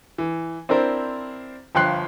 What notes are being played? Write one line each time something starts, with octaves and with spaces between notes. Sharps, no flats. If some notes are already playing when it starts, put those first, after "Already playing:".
E3
C4 D4 E4 A#4 C5
G1 F3 G5 C6 F#6 C7